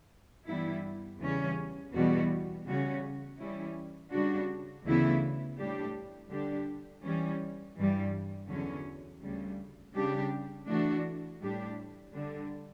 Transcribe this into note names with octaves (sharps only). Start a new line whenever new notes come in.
G2 E3 G3 B3 E4
E2 C#3 E3 G3 C#4
E2 B2 G3 B3 F#4
C#3 G3 C#4 F#4
E3 G3 C#4 E4
C#3 G3 D4 F#4
D2 C#3 E3 B3 E4
A2 G3 D4 G4
D3 G3 D4 G4
E3 G3 C#4
G2 E3 G3
E2 D3 F#3 C#4
D2 C#3 G3
C#3 G3 D4 G4
E3 A3 D4 F#4
A2 G3 D4 G4
D3 G3 D4